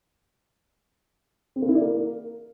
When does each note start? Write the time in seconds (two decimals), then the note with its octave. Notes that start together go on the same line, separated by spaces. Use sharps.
1.56 C4
1.62 A#3
1.69 E4
1.75 D5
1.81 A#3